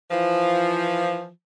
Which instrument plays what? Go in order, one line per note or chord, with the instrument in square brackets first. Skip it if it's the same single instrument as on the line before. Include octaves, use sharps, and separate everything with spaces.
[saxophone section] E3 F3